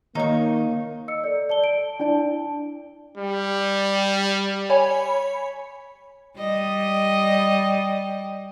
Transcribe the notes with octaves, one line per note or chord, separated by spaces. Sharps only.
D#3 A#3 D#4 C#5 C#6
D#5 E6 C#7
A4 D5
D5 A5 G7
D7
D4 E4 D5 A5
G3
C#5 G#5 B5
G3 D#5